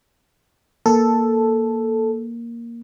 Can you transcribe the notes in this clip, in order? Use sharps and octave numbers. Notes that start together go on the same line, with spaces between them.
A#3 A4